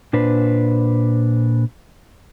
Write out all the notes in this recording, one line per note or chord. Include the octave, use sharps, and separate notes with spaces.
A#2 D4 B4 C5